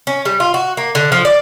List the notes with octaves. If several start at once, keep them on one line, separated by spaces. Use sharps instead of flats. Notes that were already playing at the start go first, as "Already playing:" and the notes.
C#4
G3
F4
F#4
A#3
D3
F3
D5